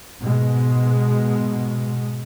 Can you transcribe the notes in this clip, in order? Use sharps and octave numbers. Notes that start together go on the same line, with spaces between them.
G#2 B2 G#3